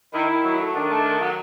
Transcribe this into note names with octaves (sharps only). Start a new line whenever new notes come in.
D#3 E4
D#3
F#3
A3
D#3 D4
A3
D#3
F#3